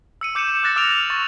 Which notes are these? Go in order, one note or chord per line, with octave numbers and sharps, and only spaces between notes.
E6 C#7 D#7
D6 G6 C#7 D#7 E7
D6 F#6 A6 A#6 C#7
D6 E6 F6 D7 F7
D7
C#6 A6